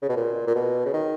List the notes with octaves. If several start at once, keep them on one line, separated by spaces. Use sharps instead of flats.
C#3
B2
A#2
A#2
B2
C#3
D#3